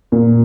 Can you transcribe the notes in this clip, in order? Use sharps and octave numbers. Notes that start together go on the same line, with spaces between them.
A#2